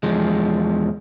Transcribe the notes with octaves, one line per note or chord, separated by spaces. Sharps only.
E2 F3 G#3